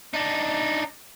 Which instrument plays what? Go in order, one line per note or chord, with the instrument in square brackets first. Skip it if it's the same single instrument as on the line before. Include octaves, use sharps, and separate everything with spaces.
[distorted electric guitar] D4 D#4